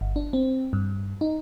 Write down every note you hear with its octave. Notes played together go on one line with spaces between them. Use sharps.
G1
D4
C4
G2
D#4